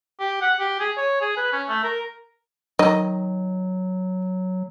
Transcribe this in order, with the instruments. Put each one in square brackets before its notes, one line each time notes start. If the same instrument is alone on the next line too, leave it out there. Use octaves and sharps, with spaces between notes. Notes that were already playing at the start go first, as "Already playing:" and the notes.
[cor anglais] G4
F#5
G4
G#4
C#5
G#4
B4
C#4
A3
A#4
[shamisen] D#3 D#5 [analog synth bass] F#3